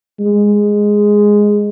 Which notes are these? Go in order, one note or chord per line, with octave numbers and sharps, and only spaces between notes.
G#3